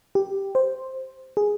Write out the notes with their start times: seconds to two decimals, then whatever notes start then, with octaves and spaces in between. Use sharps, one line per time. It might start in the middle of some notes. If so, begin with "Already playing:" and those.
0.15 G4
0.55 C5
1.37 G#4